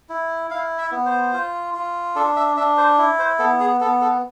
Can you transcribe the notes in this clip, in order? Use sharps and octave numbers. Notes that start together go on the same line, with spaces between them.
E4
E4 F5
E5
B3
C5
F4
F4
D4 A4
E5
D4 E5
C5
E4
C5
B3 A4
G#4
B3 A4
A4